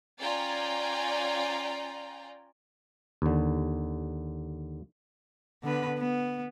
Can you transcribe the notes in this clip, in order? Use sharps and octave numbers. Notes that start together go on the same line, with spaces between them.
C#4 F4 D5 G5 G#5 A#5
D#2 D3
D3 B3 B4
B3